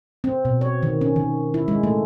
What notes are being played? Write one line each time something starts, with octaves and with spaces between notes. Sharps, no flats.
C4
B2
C#5
D#3
C#4
D#3
E4
G#3
A3